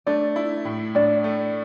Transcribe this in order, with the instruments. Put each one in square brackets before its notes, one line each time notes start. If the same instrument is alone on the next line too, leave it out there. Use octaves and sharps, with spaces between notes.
[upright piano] A3 [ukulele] D4 D5
[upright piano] E4
A2
[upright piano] A2 [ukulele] D4 D5
[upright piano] A3